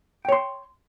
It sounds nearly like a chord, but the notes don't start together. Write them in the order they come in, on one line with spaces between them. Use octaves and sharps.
G5 C#5 C6